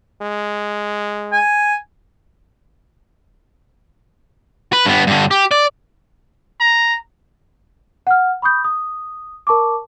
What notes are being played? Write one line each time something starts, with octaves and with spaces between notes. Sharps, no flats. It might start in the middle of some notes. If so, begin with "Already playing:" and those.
G#3
G#5
B4
G2 B3
G2 D3
G4
D5
A#5
F#5 F6
B5 C#6 D#6 G6
D#6
A#4 A5 C#6 D6